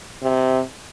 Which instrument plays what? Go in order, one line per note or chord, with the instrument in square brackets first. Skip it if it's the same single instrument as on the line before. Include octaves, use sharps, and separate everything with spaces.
[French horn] C3